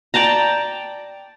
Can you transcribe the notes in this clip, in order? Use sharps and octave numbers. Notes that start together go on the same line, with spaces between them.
D5 G5 A5 A#5